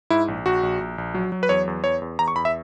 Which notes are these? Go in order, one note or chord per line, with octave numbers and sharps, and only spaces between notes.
G#2 E4
A#1
A#1 F#4
A#1
A#1
A#1
F#3
F#3
B4
E2 C#5
E2
E2 C#5
E2
E2 A#5
C#6
E2 B5
E5